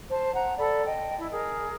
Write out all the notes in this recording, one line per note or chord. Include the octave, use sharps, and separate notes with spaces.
C5 A5
F#5 A#5
A4 D5 B5
D#5 G5
E4
G#4 A#4